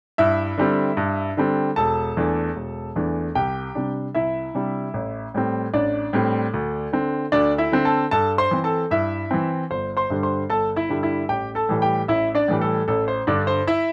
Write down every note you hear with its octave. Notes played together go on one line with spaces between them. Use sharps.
G2 E4 E5
D3 G3 C4
G2
D3 G3 C4
E1 A4 A5
E2 E3 A3 D4
E1
E2 E3 A3 D4
C2 G4 G5
C3 G3 D4
C2 E4 E5
C3 G3 D4
A1
A2 G3 C4
A1 D4 D5
A2 G3 C4
D2
D3 C4
D2 D4 D5
E4 E5
D3 C4
A4 A5
G2 A4 A5
C5 C6
E3 C4
A4 A5
G2 E4 E5
E3 C4
G1 C5
C5 C6
G2 D3 G3
C5 C6
G1 A4 A5
E4 E5
G2 D3 G3
E4 E5
A1 G4 G5
A4 A5
A2 E3 G3
G4 G5
A1 E4 E5
D4 D5
A2 E3 G3
A4
A1 A4
C5
G2 D3 D4 D5
C5
E4 E5